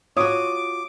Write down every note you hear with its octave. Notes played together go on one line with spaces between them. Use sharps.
F4 F#4 C#5 D6 D#6